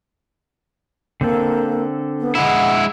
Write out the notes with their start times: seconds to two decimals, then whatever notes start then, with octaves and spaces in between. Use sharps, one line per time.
1.21 D3 A#3 C4 A4
2.20 B3
2.35 G#3 E4 F#5